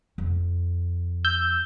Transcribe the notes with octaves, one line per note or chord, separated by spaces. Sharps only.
F2
E6 G6